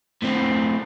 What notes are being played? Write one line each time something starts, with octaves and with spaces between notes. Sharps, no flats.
A2 C4